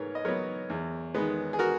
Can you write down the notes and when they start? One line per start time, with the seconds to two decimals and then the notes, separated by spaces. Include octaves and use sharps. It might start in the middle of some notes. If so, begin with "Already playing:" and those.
Already playing: G#2 B3 A#4 B4 C#5
0.15 D#5
0.25 F#3 B3 A#4 C#5
0.70 E2
1.14 D#3 G#3 B3
1.53 G#4
1.59 F#4 A#4